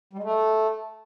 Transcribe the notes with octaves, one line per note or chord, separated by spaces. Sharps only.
G3
G#3
A3